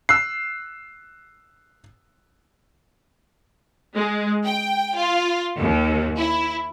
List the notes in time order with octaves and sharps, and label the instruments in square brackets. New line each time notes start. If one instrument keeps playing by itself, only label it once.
[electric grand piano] E6 F#6 C7
[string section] G#3
G5
F4
D#2
E4